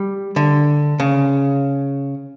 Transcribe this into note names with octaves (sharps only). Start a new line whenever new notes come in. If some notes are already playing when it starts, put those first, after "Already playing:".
Already playing: G3
D3
C#3